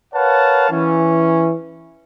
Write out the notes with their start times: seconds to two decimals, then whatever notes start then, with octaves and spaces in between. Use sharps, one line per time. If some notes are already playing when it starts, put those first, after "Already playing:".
0.14 A#4 B4 C#5 F5 F#5 A5
0.71 E3 C#4